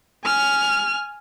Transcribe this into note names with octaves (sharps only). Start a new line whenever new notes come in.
G#5 F6